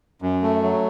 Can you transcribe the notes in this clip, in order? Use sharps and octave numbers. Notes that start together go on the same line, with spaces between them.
F#2
A3
F#3